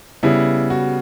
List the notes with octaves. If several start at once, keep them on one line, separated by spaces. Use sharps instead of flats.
C#3 G3 B3 E4
F#4